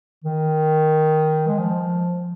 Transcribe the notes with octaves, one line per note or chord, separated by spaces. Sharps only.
D#3
G#3
F3